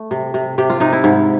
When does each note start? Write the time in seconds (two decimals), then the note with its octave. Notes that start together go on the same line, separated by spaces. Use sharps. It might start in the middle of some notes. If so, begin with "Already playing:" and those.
Already playing: A3
0.11 C3
0.34 C3
0.58 C3 G4
0.70 F4
0.80 C3 D#4
0.93 E4
1.04 G#2